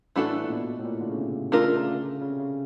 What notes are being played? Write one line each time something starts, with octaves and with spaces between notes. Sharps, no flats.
A2 E3 A3 D4 F#4 A4
A#2
B2
A2
A#2
D3
C#3
C3
C#3 A3 D4 F4 A#4
C#3
D3
C#3
C3
C#3